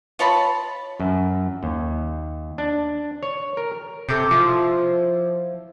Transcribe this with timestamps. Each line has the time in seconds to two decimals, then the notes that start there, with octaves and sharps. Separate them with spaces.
0.19 F4 C#5 A5 B5
1.00 F#2
1.63 D#2
2.58 D4
3.23 C#5
3.57 A#4
4.09 C3 A4 D6 G6
4.31 F3 E4